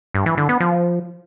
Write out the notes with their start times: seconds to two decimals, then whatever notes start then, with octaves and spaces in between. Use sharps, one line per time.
0.14 G2
0.26 E3
0.37 D3
0.49 B3
0.60 F3